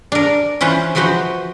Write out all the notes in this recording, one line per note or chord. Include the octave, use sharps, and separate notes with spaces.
D4 A#4
E3 C#4 F4 B4 C5
E3 F3 F#4 B4 C5